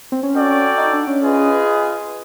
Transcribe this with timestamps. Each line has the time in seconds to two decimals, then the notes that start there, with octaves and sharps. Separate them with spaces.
0.12 C4
0.23 C#4
0.34 F#4 A4 D5 G5
0.78 D#4
0.93 D4
1.07 C#4
1.22 F4 G#4 B4 D#5